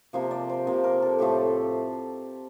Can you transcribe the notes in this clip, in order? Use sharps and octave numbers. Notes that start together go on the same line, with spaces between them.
C3 F3 A#3 C5
D5
C5
C3 F3 A#3
A#4
A4
A2 F3 A3 G4